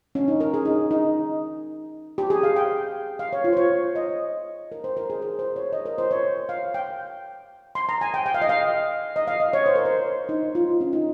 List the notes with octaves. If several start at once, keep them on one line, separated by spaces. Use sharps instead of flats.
C#4
D#4
A#4
G#4
D#4
D#4
G4
G#4
F5
G5
F5
C#5
F4
C5
C#5
D#5
A#4
C5
A#4
G#4
A#4
C5
C#5
D#5
A#4
C5
C#5
F5
G5
C6
A#5
G#5
G5
G5
F5
D#5
F5
D#5
F5
D#5
C#5
C5
A#4
C5
D#4
F4
C#4
D#4